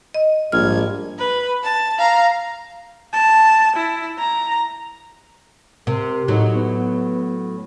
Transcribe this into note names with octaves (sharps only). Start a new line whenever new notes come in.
D#5
A#1 G#2 G3 F6 G#6
B4
A5
F5 A#5
A5
E4
A#5
C3 A#4
A2 F#3 D#4
B3